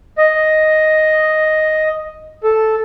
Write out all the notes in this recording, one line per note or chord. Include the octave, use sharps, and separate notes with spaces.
D#5
A4